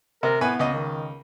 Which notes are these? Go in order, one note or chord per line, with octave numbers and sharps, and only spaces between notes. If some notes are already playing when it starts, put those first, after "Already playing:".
C3 A#4
A2 B3 B4 G#5
C#2 D#5
D#3